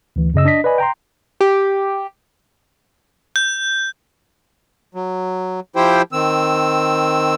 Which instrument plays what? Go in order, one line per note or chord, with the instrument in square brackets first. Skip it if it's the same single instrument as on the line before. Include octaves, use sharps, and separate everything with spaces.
[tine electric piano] D2 E3
F#2 C#3 D#5 E6
D4 D#5 B6
B4 D5 D#5 G#5 B5
G5 A#5 C6
[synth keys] G4
[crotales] G6
[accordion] F#3
F3 E4 G4 C5 G5
D#3 C4 E6